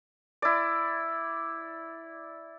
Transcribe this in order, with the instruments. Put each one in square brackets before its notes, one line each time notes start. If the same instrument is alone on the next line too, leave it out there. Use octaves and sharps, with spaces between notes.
[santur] E4 D5